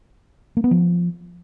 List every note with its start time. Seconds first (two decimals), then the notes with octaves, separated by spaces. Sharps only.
0.57 A#3
0.64 B3
0.71 F3